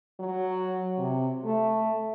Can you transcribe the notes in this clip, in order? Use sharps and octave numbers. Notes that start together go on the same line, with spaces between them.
F#3
C3
A3